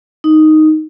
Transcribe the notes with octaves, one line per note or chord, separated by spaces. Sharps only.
D#4